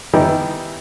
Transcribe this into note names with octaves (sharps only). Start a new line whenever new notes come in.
D#3 E3 G3 B3 D#4 E4